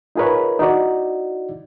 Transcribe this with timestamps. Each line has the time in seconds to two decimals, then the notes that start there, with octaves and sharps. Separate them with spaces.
0.15 D#4 F4 G#4 A#4 B4 C#5
0.59 D#4 E4 F#4 D5